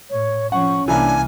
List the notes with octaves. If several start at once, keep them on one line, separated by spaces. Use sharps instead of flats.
A2 C#5
F3 C#4 F#5 C#6
C2 E3 A#3 D4 G#5